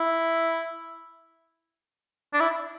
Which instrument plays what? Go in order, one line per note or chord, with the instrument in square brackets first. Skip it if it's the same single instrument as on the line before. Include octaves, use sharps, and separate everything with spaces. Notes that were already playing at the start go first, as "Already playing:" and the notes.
Already playing: [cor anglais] E4
D4
E4